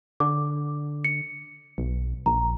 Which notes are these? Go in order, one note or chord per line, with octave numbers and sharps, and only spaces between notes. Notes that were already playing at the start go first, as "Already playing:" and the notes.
D3 D6
C#7
B1
A#1 A#5